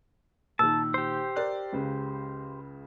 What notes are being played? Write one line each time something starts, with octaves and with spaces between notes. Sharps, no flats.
A#2 D#3 A5 E6
G4 C5
A#4 D5 F#6
C#2 C#3